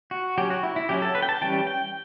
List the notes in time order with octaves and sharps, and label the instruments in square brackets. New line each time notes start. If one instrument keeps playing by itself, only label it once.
[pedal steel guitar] F#4
F#3 C#4 G4
F#4
E4
E4
F#3 C#4 G4
A4
B4
G5
A5
E3 G3 C#4 G5
G5